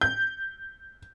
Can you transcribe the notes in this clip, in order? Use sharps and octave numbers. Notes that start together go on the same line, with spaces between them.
G6